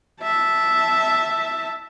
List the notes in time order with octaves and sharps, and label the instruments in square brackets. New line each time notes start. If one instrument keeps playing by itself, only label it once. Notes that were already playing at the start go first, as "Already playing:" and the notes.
[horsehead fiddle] E5 A5